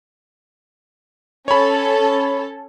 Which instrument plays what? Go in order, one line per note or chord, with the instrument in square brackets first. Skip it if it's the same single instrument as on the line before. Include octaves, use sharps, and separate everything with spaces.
[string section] C#4 A4 [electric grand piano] C#5 B5